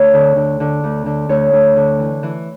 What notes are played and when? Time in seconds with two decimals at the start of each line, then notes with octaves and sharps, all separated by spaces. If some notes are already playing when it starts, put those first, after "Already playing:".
Already playing: D2 A4 C#5
0.14 D3
0.36 D3
0.60 D3
0.84 D2
1.06 D3
1.29 D2 C#5
1.53 D2
1.76 D3
1.99 E3
2.23 E3